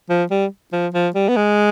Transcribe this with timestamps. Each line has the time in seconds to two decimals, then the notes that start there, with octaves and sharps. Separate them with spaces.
0.10 F3
0.31 G3
0.73 F3
0.94 F3
1.15 G3
1.29 B3
1.36 G#3